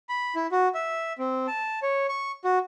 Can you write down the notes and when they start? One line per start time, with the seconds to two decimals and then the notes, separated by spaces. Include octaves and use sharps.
0.09 B5
0.35 E4
0.52 F#4
0.74 E5
1.18 C4
1.47 A5
1.82 C#5
2.09 C#6
2.44 F#4